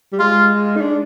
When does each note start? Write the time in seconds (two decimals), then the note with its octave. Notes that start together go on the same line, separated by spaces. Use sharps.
0.13 G3
0.19 G#3 F4
0.77 D#4
0.81 D4